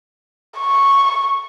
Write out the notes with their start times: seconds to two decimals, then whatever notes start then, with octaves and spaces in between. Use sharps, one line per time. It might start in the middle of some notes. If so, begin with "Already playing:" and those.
0.58 C#6